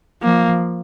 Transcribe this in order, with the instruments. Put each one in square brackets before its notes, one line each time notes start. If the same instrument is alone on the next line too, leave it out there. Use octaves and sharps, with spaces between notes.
[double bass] F3 [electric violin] A#3